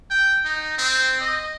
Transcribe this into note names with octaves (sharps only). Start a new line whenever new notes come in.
G5
D#4
C4
D#5